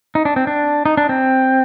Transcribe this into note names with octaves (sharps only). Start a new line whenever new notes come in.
D#4
D4
C4
D4
D#4
D4
C4